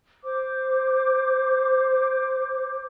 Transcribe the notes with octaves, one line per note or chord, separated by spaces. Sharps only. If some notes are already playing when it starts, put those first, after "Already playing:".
C5 D6